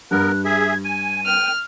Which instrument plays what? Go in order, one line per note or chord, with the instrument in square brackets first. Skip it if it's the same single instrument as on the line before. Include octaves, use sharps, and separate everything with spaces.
[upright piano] G2 [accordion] B3 A#4 [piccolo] F#6
[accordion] G#4 E5 [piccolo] G#6
[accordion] G#5 [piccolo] D#7
[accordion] G5 [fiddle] F6